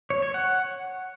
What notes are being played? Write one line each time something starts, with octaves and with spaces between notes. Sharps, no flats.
C#5
C#5
F#5